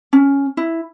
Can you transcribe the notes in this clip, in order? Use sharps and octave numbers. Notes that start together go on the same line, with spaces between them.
C#4
E4